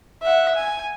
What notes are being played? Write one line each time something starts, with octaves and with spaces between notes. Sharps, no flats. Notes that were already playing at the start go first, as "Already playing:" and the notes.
E5 F#5
G#5